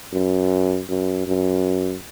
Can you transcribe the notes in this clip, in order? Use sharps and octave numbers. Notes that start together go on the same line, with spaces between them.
F#2
F#2
F#2